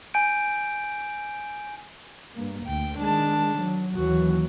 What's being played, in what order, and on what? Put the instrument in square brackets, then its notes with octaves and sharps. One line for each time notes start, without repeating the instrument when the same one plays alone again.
[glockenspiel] G#5 G6 D7
[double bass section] G2 A#3
[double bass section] D2 [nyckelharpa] G5
[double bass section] D#3 G#3 [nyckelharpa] D4 A5
[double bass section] F#3
[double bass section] D#2 E3 F#3 [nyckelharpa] F#4